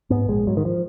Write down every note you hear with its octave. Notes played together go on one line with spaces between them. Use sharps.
G#2 B3
A#1 G#3
G#2 F#3
D#3
F3